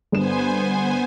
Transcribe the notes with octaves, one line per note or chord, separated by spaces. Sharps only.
G1 B3 C5 G#5 E7